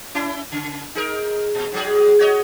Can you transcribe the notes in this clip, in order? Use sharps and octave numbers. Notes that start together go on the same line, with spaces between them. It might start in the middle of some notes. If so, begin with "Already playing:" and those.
C#4 E4
C#3
D#4 G#4 A#4
A#2
G#2 F#3 G#4
F#4 C#5 D#5